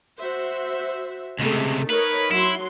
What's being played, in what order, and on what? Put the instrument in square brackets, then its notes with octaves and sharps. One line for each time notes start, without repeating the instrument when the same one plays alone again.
[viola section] F#4 C5 E5
[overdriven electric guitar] C#2 C3 [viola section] G#3 A3
[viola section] D#4 A#4 C#5 [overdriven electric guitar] B4
[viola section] F#3 C6 [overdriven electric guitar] E4